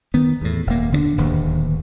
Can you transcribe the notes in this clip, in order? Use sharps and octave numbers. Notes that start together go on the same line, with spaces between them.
D#3 B3
E2 A2
D#1 A#3
D3 C4 D4
D1 D#2